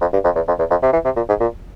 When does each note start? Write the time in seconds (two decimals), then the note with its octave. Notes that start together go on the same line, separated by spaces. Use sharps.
0.01 F2
0.13 G2
0.25 F2
0.36 E2
0.48 F2
0.59 E2
0.71 F2
0.83 C3
0.93 E3
1.05 C3
1.16 A#2
1.29 G#2
1.40 A#2